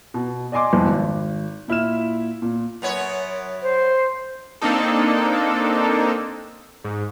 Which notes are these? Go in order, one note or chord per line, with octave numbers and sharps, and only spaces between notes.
B2
D5 D#5 G#5 C6 D6
C2 F2
G#1
A#2 E4 F6 E7
A#2
F#2 B3 C#5
C5
A#3 C4 D4 D#4 A4
G#2